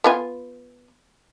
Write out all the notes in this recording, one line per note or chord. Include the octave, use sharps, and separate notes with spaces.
B3 F4 G#5